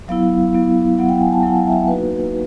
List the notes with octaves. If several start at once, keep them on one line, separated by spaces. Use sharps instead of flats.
F#3 B3 E4 F5
F#3 B3 E4
F#3 B3 E4 F#5
G5
G#5
A5
F#3 B3 E4 F#5
F5
E5
F5
A#3 D#4 F#4 B4